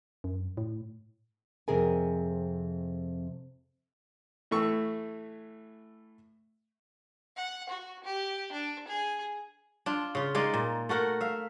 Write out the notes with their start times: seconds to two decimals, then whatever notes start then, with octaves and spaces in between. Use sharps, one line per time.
0.24 F#2
0.57 A2
1.68 F2 C3 G#4 A#4 G#5
4.51 A2 E3 A3 C#6 E6
7.36 F#5
7.69 F#4
8.04 G4
8.52 D4
8.87 G#4
9.86 D4 F4
10.15 C#3 F4
10.35 G#3 D#4 F4 D5
10.54 A#2
10.89 A3 F#4 A#4 F#5
11.21 E5 F5